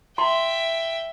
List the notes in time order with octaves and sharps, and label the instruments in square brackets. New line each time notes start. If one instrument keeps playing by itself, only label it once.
[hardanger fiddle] E5 G5 [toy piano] C6